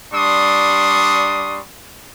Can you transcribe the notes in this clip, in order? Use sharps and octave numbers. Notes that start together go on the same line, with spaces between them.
G3 D4 C6 C#6 D#6